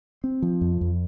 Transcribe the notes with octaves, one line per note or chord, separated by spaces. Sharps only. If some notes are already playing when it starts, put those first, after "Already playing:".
C4
F3
F2
F2